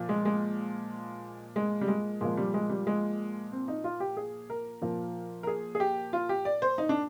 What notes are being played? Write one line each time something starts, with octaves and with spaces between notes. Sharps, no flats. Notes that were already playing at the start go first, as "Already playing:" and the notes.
Already playing: A#2 F3
G#3
G#3
G#3
G3
G#3
A#2 F3 G#3
G3
G#3
G3
G#3
C4
D#4
F4
G4
G#4
A#4
A#2 F3
A#4
G#4
G#4
G4
F4
G4
D5
C5
D#4
D4